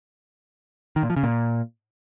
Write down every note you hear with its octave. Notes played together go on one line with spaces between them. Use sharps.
D#3
A#2
F3
C#3
A#2